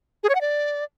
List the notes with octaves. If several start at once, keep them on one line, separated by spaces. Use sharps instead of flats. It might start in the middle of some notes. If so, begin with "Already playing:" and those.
G#4
C#5
F#5
D5